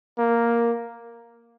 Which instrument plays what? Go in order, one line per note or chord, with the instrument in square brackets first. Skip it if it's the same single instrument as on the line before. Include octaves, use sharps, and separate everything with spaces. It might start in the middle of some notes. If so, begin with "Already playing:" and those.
[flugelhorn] A#3